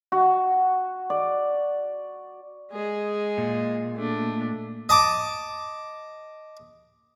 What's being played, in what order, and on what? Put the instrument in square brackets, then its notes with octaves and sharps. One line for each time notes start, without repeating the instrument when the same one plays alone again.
[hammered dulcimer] F#4
D5
[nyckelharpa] G#3 G#4
[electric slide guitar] A#2
[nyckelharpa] A3 D4
[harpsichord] D#5 A5 D6